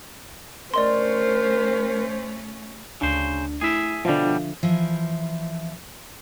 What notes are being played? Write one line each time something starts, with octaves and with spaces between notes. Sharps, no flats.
A3 C#4 A#4 C5 D5 D#5 C6
D2 C#3 D4 C5
A3 E4 G#4 E5
B2 D3 F3 G3 E5 F5
E3 F3 E4